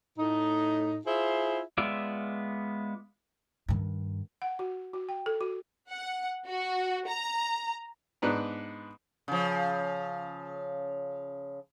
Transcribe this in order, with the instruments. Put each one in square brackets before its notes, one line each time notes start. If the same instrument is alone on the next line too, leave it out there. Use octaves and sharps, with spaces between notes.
[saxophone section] A2 D#4
E4 F4 G#4 C5 E5
[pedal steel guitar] G#3 B3 F4 D5 E5
[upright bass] G2 D#3
[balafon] F#5
F#4
F#4
G5
A4
F#4
[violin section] F#5
F#4
A#5
[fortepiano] G#2 B3 D4 B4 A#5
[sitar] C#3 F3